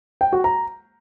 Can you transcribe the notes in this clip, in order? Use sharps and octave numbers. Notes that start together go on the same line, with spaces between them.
G5
F#4
A#5